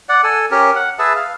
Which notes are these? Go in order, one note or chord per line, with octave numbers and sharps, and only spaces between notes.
D5 F#5
A4 G#5
C#4 G4 A#4
F#5
G#4 B4 E5 A5
F5